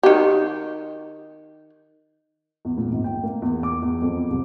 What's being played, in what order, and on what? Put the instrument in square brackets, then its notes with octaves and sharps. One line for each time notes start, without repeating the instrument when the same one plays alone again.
[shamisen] D#3 G4
[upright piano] E2
A#2
G#1
G5
A#3
E2
D6
E2
F2
C2